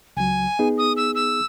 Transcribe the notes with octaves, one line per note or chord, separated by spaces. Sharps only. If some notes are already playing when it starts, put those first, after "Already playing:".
C#2 F#3 G#5
B3 D#4 G#4
D#6
E6
E6